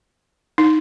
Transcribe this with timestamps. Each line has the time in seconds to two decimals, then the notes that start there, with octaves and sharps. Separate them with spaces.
0.58 D#4